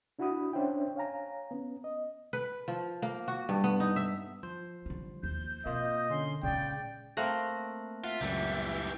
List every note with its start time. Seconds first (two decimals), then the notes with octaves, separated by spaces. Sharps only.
0.19 D4 E4 F#4 F#5 B5 D#6
0.53 C#4 D4 C5 C#5 E5 G5
0.96 C#5 F5 G#5 A#5
1.51 B3 C#4
1.84 D#5
2.33 B4
2.68 F3
3.02 A#3
3.28 F#4
3.49 G2
3.64 B3
3.80 D#4
3.96 E5
4.43 F3 C5
4.86 D3 G3
5.23 D#2 G6
5.66 B2 A#3 C4 F4 D#5
6.10 D3 C#4 C6
6.43 A#2 C#3 G#3 D5 G5
7.17 A3 A#3 C4 A#5 F#6 A#6
8.04 F4 E5 F#5
8.21 C#2 F#2 A#2 E3 G3